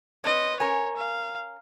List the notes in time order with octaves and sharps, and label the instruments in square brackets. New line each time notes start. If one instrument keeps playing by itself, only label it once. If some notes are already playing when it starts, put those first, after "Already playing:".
[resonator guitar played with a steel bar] C4 C#5 [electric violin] B4 D#5
[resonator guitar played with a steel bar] C#4 A#4 G#5 [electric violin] C#5
[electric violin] F5